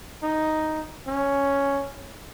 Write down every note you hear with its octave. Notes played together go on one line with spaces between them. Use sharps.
D#4
C#4